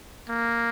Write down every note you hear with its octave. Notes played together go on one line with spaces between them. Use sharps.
A#3